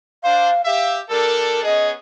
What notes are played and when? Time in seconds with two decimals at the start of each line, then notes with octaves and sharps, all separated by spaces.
0.23 D4 C5 F5
0.65 G4 E5 F5
1.09 G3 D4 A4 A#4
1.64 B3 C#4 G#4 D#5